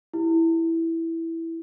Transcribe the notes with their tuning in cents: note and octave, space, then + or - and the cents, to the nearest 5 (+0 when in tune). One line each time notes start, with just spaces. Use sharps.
E4 +0 G4 +0